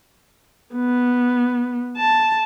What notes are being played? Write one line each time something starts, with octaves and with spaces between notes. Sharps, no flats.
B3
A5